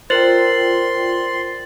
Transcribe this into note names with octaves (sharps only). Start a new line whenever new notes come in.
F4 A#4 C5 D5 G5 C6 A6 F#7